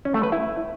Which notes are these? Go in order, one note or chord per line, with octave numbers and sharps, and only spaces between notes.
C#4
A3
B4
E4